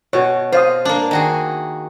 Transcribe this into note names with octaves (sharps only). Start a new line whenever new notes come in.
B2 F#4 C#5
F4 C5 F5 D#6
A#3 D4
D#3 F#4 G#4